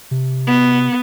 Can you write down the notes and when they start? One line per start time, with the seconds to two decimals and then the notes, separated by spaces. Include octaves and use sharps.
0.11 C3
0.47 B3